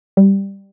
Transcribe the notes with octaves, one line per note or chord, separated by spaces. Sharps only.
G3